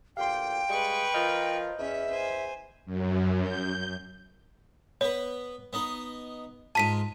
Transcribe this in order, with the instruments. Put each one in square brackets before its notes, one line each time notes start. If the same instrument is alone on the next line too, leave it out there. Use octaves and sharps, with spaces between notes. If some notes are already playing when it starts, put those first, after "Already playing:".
[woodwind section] D2 A#2 G4 [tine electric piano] F5 C6 [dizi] G5
[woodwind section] G3 G#3 [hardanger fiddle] B4 C#6
[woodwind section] F3 A#4 [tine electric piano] D#5 F6 G6
[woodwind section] E2 [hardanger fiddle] C#4 [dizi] E5
[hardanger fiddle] C5 G#5
[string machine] F#2
G6
[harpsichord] B3 B4 [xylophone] C#5
[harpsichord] B3 D#4 D#5
[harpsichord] G#2 F4 [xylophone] A5 B6 D#7